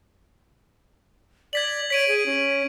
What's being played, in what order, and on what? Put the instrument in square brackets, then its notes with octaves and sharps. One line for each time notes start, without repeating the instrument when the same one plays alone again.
[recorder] D5 [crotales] G#6 B6 F#7
[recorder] C#5 [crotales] B6 D7 D#7
[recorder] G#4
C#4